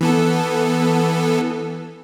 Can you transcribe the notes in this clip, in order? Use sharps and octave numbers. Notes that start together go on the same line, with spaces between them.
E3 B3 A4